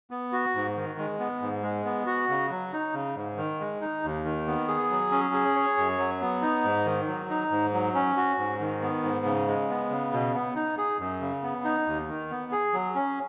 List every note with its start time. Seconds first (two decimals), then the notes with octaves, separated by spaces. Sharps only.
0.11 B3
0.32 F#4
0.55 G#2
0.76 D#3
0.98 G#3
1.19 B3
1.42 G#2
1.63 G#3
1.85 B3
2.06 F#4
2.29 C#3
2.50 F#3
2.73 D#4
2.94 C#3
3.16 G#2
3.37 D#3
3.60 G#3
3.81 D#4
4.03 D#2
4.24 D#3
4.47 B3
4.68 G#4
4.90 F#3
5.11 C#4
5.34 G#4
5.56 C#5
5.77 F#2
5.98 F#3
6.21 B3
6.42 D#4
6.64 G#2
6.85 D#3
7.08 F#3
7.30 D#4
7.51 G#2
7.73 F#3
7.94 C#4
8.17 F#4
8.38 G#2
8.60 D#3
8.82 B3
9.03 G#2
9.25 C#3
9.47 G#3
9.69 B3
9.90 C#3
10.12 B2
10.34 B3
10.55 D#4
10.78 G#4
10.99 F#2
11.21 C#3
11.43 B3
11.65 D#4
11.86 D#2
12.08 D#3
12.30 B3
12.52 G#4
12.74 F#3
12.95 C#4